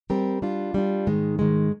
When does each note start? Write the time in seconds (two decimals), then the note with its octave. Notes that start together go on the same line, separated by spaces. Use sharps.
0.10 G3 C4 G4 A#4
0.42 G3 D4 F4
0.74 G3 D4 F4
1.07 G#2 D#3 G#3
1.39 G#2 D#3 G#3